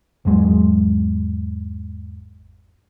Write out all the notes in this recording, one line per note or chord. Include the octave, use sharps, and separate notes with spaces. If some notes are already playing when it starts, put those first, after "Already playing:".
G#1 E2 F#3 G#3